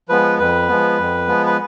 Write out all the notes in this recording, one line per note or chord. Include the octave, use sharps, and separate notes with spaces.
F3 G#3 B3 B4
F2 B4
F3 G#3 B3
F2
F3 G#3 B3
B4